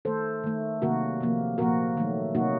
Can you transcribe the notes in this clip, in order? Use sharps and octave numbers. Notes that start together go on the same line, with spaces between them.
D#3 A3 A4 C5
D#3 A3
C3 D#3 F#3 A#3 F#4 A#4
C3 F3 A#3
A#2 F3 A#3 F#4 A#4
D#3 F#3 A3
C3 F#3 A#3 D#4 F#4